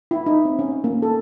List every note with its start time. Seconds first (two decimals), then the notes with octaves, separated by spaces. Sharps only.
0.11 E4
0.26 D#4
0.45 C4
0.59 C#4
0.84 A#3
1.02 A4